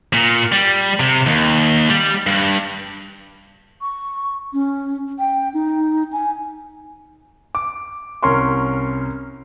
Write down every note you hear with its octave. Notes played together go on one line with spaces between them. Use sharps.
A#2
G3
C3
D#2
G3
G2
C#6
C#4
G5
D#4
G#5
D6
C2 C#4 A#4 C6 C#6